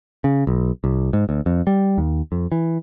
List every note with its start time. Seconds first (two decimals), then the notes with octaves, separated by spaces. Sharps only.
0.24 C#3
0.47 B1
0.84 C2
1.13 G#2
1.29 D2
1.46 F2
1.67 G3
1.98 D#2
2.32 F2
2.52 E3